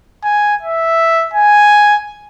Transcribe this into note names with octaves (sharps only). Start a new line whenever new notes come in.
G#5
E5
G#5